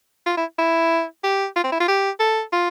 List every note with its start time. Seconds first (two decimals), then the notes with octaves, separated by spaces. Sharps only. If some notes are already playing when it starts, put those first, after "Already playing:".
0.26 F4
0.37 E4
0.59 E4
1.23 G4
1.56 F4
1.64 C4
1.72 E4
1.80 F4
1.88 G4
2.20 A4
2.53 F4